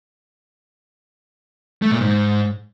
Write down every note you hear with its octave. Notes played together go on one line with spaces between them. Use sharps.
A3
A#2
G#2